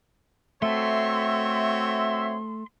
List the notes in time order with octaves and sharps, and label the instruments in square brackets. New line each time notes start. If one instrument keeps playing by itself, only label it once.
[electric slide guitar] A3 A4 [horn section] C4 F#4 C#5 [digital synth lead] E5 [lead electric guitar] C6